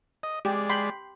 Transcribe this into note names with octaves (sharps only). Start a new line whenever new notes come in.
D#5
G#3 G4 D5
G5 B5 C6